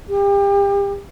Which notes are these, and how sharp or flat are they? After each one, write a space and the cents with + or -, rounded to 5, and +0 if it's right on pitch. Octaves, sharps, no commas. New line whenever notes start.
G4 +30